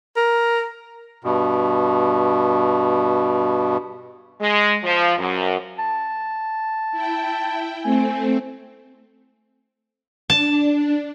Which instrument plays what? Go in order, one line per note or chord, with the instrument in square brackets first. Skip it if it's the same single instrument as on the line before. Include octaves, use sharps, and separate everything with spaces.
[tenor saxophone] A#4
[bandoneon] G2 B2
[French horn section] G#3
F3
F#2
[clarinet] A5
[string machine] E4 G5
[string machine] A3 C4 [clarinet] G#5
[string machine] D4 [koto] A5